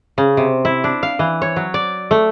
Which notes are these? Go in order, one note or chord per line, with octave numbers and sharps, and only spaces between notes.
C#3
C3
E4
D4
F5
E3
C#5
F#3
D5
A3